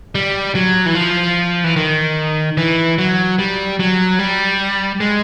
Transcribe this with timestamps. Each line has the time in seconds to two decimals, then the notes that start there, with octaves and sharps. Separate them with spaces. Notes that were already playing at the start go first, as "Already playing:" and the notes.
0.15 G3
0.55 F#3
0.86 E3
0.95 F3
1.64 E3
1.76 D#3
2.57 E3
2.98 F#3
3.39 G3
3.80 F#3
4.19 G3
5.00 G#3